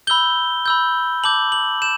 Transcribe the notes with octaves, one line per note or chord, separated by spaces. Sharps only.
B5 E6 G6 G7
B5 E6 G6
A5 D6 G6 F#7
F#7
G6 E7